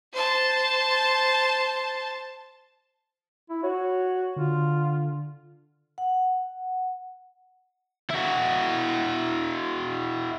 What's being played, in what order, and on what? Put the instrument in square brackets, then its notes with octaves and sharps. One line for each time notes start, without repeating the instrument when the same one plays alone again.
[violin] C5 A5
[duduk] E4
[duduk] F#4 [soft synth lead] C#5
[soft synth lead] D3 [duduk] F4
[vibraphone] F#5
[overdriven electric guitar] E4 F#4